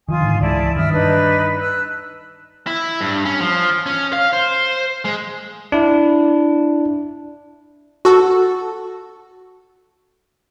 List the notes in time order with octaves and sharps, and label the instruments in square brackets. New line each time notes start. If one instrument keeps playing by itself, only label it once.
[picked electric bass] D#3 F3 [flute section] F4 G#5 D#6
[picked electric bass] G#2 D3 D#3
[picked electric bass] C#2 E3 G#3 [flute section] E4 D5 A5
[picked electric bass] G2 D#3 [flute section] E5 D#6 F6
[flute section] D4 D#4 B4
E6 F#6
[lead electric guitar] E4
G2
C#4
F3
C#4
F5
C5
G#3
[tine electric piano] D4 E4
[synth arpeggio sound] F#4 A4